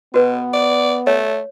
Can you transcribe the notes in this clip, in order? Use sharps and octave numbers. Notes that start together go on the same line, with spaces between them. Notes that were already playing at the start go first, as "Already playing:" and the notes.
B2 B3 F#4 B4
D5
A3 C#5